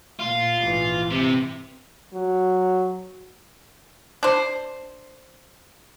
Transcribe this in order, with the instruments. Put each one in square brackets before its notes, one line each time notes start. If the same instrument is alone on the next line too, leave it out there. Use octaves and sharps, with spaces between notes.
[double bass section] A#2 [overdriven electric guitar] F4
[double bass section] A#1 G#2 E3
[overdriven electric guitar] C3
[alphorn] F#3
[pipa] D4 C5